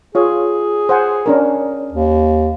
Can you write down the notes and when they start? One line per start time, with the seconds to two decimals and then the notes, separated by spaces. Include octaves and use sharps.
0.15 F4 G#4 C#5
0.89 C5 F#5 G#5
1.26 C#4 D4 A#4
1.92 D#2